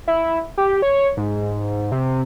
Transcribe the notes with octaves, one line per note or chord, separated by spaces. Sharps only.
E4
G4
C#5
G#2
C3